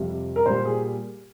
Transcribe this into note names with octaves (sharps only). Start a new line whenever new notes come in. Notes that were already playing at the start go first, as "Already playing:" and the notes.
Already playing: F2 C3 G3
A#4
A#2 G3 C5
G#4